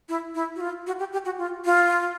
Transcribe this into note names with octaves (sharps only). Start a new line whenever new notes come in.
E4
E4
F#4
F4
F#4
G4
G4
F#4
F4
F4